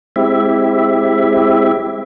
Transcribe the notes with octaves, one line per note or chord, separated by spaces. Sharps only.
G#3 C4 E4 G4 E5